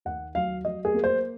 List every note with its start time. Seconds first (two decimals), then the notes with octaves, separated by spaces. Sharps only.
0.05 D#2 F#5
0.35 F#3 F5
0.65 F#3 D#5
0.85 G#4
0.94 A#3
1.04 C5